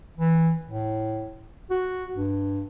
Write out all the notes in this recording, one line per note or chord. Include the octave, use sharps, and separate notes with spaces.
E3
A2
F#4
G2